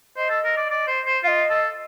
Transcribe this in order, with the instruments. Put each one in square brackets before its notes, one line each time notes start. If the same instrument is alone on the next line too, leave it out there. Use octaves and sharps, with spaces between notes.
[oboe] C5 [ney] D#5
[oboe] A4
A#4
D5
D5
C5
C5
[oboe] F4 [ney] F5
[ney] D#5
[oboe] A4